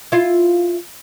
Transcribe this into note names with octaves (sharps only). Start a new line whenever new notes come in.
E4 F4